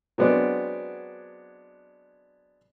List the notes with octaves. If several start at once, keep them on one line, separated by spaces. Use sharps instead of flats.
F#3 G#3 B3 C4 D4